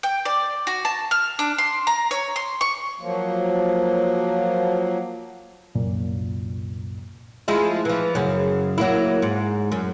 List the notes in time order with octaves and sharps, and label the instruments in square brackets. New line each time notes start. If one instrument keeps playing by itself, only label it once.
[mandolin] G5
D5
F#4
A5
F6
D4
C6
A#5
C#5
C6
C#6
[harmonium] F3 F#3 A#3
[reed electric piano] C2 F#2 A#2
[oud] F3 G#3 E4
E3 F3
F#2 C#3
F#3 A#3 E4
G#2
F#2